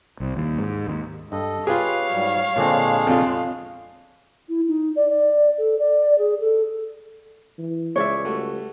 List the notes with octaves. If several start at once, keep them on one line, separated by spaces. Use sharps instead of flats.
C2
D#2
G#2
D#2
G2 A4 D#5
F4 G4 G#4 B4 C#5 F5
G#2 F#3 G3
A#2 D3 G#3 C4 D4 G#4
F2 F4
E4
D#4
D5
D5
A4
D5
G#4
A4
E3
C#2 G#3 C#5 D5 E5
G3 A3 F#4